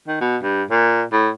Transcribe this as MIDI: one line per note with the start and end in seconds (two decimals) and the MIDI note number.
0.08 0.17 51
0.21 0.37 47
0.42 0.63 43
0.70 1.03 46
1.12 1.30 45